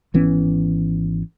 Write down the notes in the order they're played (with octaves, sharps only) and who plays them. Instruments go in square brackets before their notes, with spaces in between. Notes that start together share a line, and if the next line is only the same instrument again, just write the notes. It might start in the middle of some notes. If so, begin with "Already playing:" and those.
[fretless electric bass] G#1 E3 B3 C#4